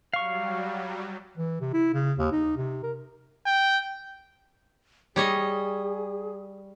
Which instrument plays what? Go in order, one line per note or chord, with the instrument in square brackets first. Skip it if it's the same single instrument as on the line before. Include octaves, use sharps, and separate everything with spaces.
[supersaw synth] F#3 G3 [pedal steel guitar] F5 C#6
[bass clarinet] E3
C3
E4
C#3
D#2
D#4
C3
A#4
[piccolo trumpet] G5
[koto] G3 C#5 D#5 [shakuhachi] G#4